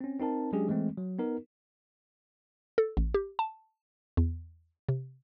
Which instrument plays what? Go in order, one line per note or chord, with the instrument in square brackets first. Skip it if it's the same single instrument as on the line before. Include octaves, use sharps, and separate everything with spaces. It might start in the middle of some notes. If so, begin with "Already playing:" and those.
[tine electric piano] C4 C#4
C4 D#4 A#4 A5
F#3 G#3 C#4 D4 G4 G#4
E3 G#3 A3 C4
F#3
B3 D#4 A#4
[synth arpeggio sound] A4
A1
G4
A5
E2
C3